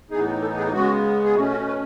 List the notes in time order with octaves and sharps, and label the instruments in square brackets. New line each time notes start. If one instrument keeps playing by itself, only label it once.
[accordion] A2 E3 B3 D#4 G#4
A4
G#4
C#3 G#3 B3 F#4
G#4
B2 A3 C#4 F#4
F#4
B4